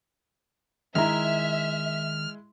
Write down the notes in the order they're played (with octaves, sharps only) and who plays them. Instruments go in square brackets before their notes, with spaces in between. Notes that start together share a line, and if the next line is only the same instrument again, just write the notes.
[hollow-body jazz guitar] D#3 A#5 [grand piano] G#3 E4 [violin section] E5 [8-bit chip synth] F6